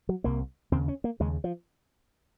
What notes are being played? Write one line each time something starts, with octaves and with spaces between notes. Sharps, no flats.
F#3
C2 C3 A#3
D#2 C#3 C4
C#4
A#3
D#2 C#3 G#3
F3